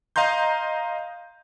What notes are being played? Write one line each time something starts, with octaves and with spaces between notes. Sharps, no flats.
D#5 F5 A#5 C6 G6